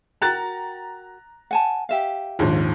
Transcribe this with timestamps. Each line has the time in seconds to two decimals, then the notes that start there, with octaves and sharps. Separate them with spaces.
0.22 F#4 A#4 G5 A#5 F#6 A6
1.51 F#5 G#5 A5
1.89 G4 E5 F5
2.39 A#1 D#2 G#2